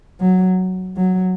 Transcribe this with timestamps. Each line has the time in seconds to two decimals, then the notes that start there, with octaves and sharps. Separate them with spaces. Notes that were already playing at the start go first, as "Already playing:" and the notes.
0.21 F#3
0.97 F#3